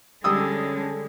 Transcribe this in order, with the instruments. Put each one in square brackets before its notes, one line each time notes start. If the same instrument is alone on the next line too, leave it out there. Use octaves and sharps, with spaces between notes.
[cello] D3 G#3 [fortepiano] G3 D#6 E6 [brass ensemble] C#4 A4